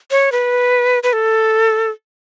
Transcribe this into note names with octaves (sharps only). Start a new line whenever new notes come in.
C#5
B4
B4
A4